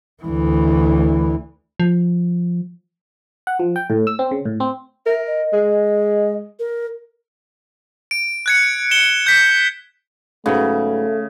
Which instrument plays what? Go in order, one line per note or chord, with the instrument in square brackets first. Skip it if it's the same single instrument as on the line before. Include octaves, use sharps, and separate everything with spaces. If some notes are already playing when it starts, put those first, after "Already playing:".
[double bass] D2 E3
[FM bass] F3
[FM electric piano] F#5
F3
G5
A2
E6
C4
C#3
A2
C4
[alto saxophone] A#4 [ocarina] E5
[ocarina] D#5
[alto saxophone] G#3
[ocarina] A#4
[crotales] D7
F#6 G#6 C#7
C#7 E7 G7
G6 B6
[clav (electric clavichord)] G#2 F#3 B3 [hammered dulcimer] C#3 [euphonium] A3